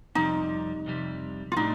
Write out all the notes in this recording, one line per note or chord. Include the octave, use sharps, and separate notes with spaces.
F2 C3 G3 D#4
F2 C3 G3
F4
A2 G3 D4 D#4